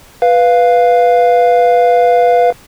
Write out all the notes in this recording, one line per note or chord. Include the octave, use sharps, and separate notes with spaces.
B4 F5